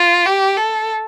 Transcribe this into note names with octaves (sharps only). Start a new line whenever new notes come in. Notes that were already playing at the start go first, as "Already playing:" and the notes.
Already playing: F4
G4
A4